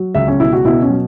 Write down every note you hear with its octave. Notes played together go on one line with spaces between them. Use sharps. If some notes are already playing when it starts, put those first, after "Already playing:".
Already playing: F#3
C#2 E5
C#4
B2 E4
F#4
B2 E4
C#4
F#3